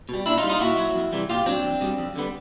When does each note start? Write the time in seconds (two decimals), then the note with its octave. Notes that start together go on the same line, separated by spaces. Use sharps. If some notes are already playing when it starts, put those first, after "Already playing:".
0.09 B2 G3
0.26 A#2 D4 E4
0.37 D#4 F4
0.43 G3
0.49 D#4 F4
0.61 A#2 E4 F#4
0.78 F#3
0.95 F2
1.12 C3 E3 G3
1.30 A#2 F4 G4
1.46 F#3 C4 D4
1.64 E2
1.81 B2 G3
1.98 F2
2.16 D3 G3 B3